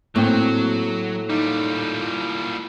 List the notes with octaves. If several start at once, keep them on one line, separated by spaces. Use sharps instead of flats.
A2 F#3 A#3 C4 G5
A#2 G3 D#4